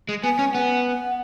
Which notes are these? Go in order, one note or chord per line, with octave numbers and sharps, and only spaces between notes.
G#3
B3 G#5
C#4
B3 F#5